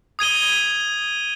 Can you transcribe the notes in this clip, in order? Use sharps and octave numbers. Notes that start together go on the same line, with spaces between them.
D#6 G#6 D#7 G7